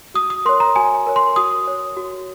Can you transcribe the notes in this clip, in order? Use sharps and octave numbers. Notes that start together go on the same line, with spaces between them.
F#4 D#6
D#6
A#4 C#5 C6
A#5
F#4 G#5
A#4 C#5
C6
F#4 D#6
C#5
F#4